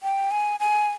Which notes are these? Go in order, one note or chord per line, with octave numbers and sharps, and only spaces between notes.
G5
G#5
G#5